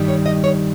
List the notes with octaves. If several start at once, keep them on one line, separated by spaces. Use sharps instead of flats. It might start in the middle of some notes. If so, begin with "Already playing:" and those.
Already playing: G2 D#3 G3
C#5
D#5
C#5